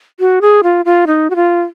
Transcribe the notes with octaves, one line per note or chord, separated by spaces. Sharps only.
F#4
G#4
F4
F4
D#4
F#4
F4